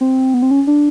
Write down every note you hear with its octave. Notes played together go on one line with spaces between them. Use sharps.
C4
B3
C4
C#4
D4